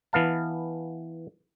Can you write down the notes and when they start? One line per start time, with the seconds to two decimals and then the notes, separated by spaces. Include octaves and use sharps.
0.13 E3 B3 F5 A5